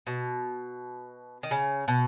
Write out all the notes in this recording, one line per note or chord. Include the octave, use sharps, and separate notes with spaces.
B2
D#3
C#3
B2